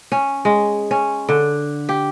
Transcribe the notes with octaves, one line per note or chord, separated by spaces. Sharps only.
C#4
G#3
C#4
D3
G4